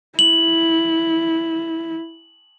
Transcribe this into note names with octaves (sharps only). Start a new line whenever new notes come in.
E4 F#7